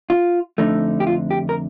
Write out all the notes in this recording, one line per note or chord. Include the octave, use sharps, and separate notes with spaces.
F4
F2 D3 A3 D#4
G4
F4
G4
A#4